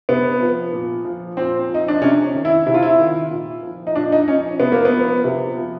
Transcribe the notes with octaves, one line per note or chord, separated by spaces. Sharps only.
C3 B3
F3
A#2
F3
A#2 C4
F3
D#4
D4
C3 C#4
D#3
E4
C3 E4
F4
E4
D#3
A#2
F3
D#4
A#2 D4
D#4
F3 C#4
C3 B3
A#3
B3
F3
C3
F3